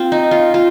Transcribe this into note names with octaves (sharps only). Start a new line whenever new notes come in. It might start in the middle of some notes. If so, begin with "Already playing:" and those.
Already playing: C4 F4
D#4
F4
F4